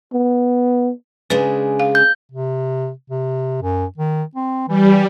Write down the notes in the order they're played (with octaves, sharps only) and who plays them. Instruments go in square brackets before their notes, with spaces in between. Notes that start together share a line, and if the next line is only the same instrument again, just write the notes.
[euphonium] B3
[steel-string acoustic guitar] C#3 G#3 D4 [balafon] B4
[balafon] F5
[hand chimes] G6
[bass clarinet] C3
C3
F#2
D#3
C4
[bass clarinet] E3 [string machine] G3